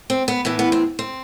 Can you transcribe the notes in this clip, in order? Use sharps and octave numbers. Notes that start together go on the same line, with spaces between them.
C4
B3
A2 E3 B3
B3
C4
C4